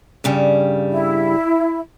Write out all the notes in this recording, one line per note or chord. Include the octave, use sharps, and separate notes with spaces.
G2 C#3 G3
E4